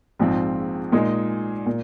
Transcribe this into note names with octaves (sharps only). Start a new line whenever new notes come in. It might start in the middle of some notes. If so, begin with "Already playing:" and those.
A#1 G#2 F3 C4 F4
A#2 G#3 D#4 G#4
A#2